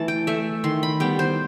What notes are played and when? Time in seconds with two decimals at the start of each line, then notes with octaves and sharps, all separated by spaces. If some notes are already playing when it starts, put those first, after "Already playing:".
Already playing: E3 A3 A5
0.08 G5
0.27 A3 E5
0.64 D#3 C6
0.83 B5
1.00 G3 B3 G5
1.19 C5